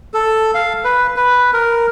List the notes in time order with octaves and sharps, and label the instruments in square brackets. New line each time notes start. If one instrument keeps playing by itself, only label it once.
[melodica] A4
F5
B4
B4
A#4